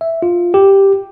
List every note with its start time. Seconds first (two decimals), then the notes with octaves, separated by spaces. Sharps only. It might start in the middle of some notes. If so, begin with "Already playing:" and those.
0.01 E5
0.22 F4
0.54 G4